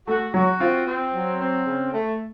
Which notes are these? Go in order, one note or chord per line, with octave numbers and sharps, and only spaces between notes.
A3 F#4
F#3 F#4
C4 F4
C4
F#3
C4
C#3
A3